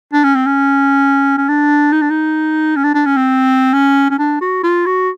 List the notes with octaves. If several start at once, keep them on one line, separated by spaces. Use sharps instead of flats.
D4
C#4
C4
C#4
C#4
D4
D#4
D4
D#4
C#4
D4
D4
C#4
C4
C#4
C#4
D4
F#4
F4
F#4